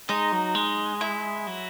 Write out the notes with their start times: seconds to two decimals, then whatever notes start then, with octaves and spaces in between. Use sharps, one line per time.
0.09 G#3 D#4
0.32 F#3
0.55 G#3
1.01 E4
1.47 F#3